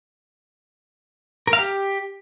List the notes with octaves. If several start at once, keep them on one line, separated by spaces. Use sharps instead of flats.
A#4
F5
G4